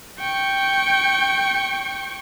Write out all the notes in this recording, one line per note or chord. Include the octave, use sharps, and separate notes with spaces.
G5 C#6